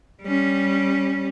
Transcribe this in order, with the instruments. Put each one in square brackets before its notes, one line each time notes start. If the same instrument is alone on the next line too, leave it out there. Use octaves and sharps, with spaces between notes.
[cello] G3 C#4